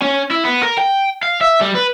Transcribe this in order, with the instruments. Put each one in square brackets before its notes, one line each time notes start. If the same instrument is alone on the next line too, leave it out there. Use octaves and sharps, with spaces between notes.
[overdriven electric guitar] C#4
E4
B3
A#4
G5
F5
E5
G3
B4